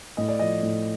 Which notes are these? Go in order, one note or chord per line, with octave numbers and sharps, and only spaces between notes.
A2 D#5
D5
F3 D#5
A2